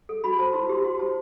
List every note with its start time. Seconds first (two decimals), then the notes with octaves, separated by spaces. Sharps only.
0.09 A4
0.24 F#4 B5
0.39 C5 A5
0.53 E4 C6
0.69 G4 C6
0.84 F#4 C6
0.99 C5 A5